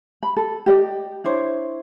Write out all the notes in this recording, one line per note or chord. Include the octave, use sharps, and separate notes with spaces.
B5
A4
G4 D5 D#5
D4 E4 C5 C#5